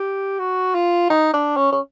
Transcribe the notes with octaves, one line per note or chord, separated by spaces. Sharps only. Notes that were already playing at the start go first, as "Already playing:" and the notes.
Already playing: G4
F#4
F4
D#4
D4
C#4
C#4